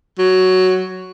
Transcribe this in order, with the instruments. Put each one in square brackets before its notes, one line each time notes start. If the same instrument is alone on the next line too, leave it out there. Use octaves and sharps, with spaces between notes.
[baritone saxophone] F#3